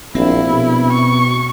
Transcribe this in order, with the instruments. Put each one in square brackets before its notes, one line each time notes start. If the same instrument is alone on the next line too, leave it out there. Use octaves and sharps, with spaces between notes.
[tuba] A#1 [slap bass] C4 [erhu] E4
[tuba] B2
[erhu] C#6